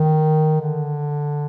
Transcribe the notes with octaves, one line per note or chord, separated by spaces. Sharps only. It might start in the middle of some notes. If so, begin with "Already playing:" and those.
Already playing: D#3
D3